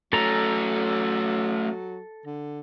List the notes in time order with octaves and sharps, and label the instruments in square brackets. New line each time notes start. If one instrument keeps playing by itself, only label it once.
[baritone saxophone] F#3 [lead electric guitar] A3 C#4 [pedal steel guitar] A4 A#5
[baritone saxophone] D3